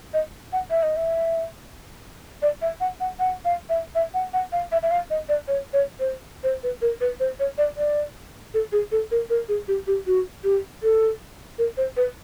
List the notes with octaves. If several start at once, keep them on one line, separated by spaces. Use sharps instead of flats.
D#5
F#5
E5
D#5
E5
D5
E5
F#5
F#5
F#5
F5
E5
E5
F#5
F#5
F5
E5
E5
F5
D#5
D5
C#5
C#5
C5
C5
B4
A#4
B4
C5
C#5
D5
D5
A4
G#4
A4
A#4
A#4
G#4
G4
G4
F#4
G4
A4
A#4
C5
B4